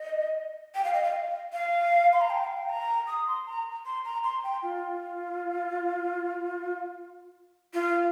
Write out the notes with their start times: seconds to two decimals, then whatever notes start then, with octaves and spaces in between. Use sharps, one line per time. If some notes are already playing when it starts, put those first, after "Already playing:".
Already playing: D#5
0.75 G5
0.84 F5
0.94 D#5
1.04 F5
1.53 F5
2.13 C6
2.21 A#5
2.30 G5
2.44 F5
2.57 G5
2.69 A#5
3.08 D#6
3.27 C6
3.47 A#5
3.86 C6
4.05 A#5
4.24 C6
4.44 G5
4.63 F4
7.74 F4